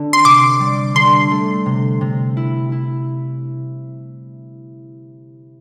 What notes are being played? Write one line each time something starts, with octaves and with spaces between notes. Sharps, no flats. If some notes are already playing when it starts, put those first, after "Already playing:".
Already playing: D3 C4 D4
C6
C3 D6
G3
D3 C6
A3
C3
C3
E4
E4